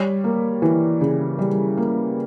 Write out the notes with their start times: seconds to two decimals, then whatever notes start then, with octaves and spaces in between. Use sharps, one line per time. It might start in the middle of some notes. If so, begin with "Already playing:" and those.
Already playing: G3 C#5
0.24 A#3
0.62 E3
1.01 C#3
1.39 G3
1.77 A#3